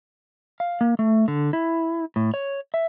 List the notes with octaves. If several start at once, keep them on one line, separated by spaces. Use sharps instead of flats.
F5
A#3
A3
D3
E4
A2
C#5
E5